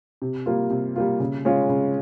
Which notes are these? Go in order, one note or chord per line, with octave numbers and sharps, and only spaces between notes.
C3
G3 A#3 F4
C3
G3 A#3 F4
C#3
G#3 C#4 F4
C#3